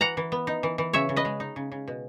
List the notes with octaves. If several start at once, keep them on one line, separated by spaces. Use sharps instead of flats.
E3 F#5 A#5
E3
B3
D#4
E3
E3
C#3 C#5 E5
C#3
B4 D#5
G#3
D#4
C#3
C#3
B2